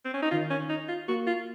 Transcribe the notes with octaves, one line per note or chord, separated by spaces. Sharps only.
C4
C#4
D#4
D#3 F4
C#4
D#4
F4
A#3 F#4
F4